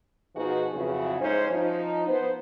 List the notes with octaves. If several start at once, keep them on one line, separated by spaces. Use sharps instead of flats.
B2 F3 B3 D#4 F#4 G#4
F2 C#3 F#3 E4 F#4 G#4
G#2 C#4 D#4 C5
F3 D#4
B3 B4 C5